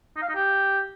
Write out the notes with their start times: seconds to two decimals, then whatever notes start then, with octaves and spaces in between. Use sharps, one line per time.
0.16 D#4
0.22 F5
0.29 D#4
0.35 G4